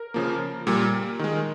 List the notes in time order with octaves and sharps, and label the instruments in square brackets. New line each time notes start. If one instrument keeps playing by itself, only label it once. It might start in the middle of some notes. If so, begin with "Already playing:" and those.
Already playing: [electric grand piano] A#4
C#3 F3 A#3
A#2 G3 A#3
D#3 G#3